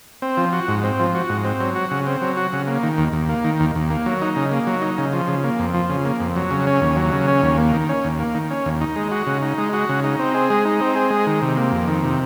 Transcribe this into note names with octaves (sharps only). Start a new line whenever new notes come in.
C4
F3
F#4
G#2
C4
F3
F#4
G#2
C4
F#3
F#4
C#3
C4
F#3
F#4
C#3
A#3
D#3
D#2
D#2
A#3
D#3
D#2
D#2
A#3
F#3
D#4
C#3
A#3
F#3
D#4
C#3
F3
C#3
A#3
F2
F3
C#3
A#3
F2
F#3
C#3
C#4
D#2
F#3
C#3
C#4
D#2
A#3
D#3
C#4
D#2
A#3
D#3
C#4
D#2
D#4
G#3
F#4
C#3
D#4
G#3
F#4
C#3
D#4
C4
G#4
G#3
D#4
C4
G#4
G#3
D#3
C3
A#3
F2
D#3
C3